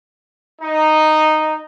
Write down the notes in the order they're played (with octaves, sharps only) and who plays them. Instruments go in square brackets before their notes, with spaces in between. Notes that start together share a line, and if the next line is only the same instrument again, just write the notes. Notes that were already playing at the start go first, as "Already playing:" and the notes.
[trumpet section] D#4